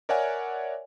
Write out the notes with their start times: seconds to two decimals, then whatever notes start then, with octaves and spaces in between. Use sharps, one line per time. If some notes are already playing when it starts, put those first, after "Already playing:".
0.09 A#4 C#5 D5 E5 F#5 G#5